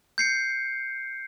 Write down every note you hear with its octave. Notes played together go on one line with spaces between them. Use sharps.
G6 C7 C#7